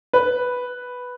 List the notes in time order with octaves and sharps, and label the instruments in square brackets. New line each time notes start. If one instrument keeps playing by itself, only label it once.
[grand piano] B4